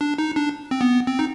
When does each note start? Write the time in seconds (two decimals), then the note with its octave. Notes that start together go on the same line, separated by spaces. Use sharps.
0.01 D4
0.18 D#4
0.36 D4
0.71 C4
0.81 B3
1.07 C4
1.19 D#4